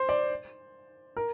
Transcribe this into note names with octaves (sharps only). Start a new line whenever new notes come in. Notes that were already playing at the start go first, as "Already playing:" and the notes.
Already playing: C5
D5
A#4